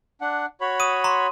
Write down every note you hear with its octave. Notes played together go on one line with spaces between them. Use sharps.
D4 F#5
F#4 C#5 B5
D#6 D#7
A#5 C6